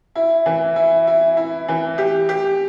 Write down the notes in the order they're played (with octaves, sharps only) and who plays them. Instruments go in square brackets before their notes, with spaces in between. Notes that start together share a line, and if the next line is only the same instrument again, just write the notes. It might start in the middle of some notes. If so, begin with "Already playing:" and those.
[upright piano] E4
E3
E4
E4
E4
E3
G4
G4